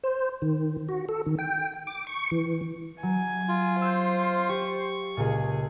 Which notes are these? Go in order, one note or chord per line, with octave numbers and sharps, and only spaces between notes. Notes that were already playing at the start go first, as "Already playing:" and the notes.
C5
D#3
F#4
A4
D#3
G5
D6
C#6
E3
F#3 G#5
F4
C5 E6 G6
G4 C#6
C#2 A#2 G#4